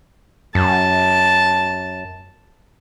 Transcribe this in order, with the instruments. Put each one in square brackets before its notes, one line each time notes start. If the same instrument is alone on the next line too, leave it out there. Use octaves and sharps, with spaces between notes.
[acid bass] F#2 [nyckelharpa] A5